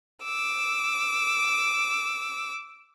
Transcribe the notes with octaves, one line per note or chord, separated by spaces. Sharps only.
D6 E6